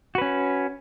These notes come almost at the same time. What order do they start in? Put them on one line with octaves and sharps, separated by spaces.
F#4 B4 C#4